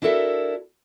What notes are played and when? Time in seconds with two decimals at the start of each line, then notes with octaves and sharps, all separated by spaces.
0.02 D4 E4 F#4 A4 A#4 E5